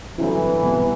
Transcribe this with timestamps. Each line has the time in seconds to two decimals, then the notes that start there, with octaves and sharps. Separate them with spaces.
0.18 G2 D3 E3 F#3 C4 E4
0.62 C2 B2 G3 B3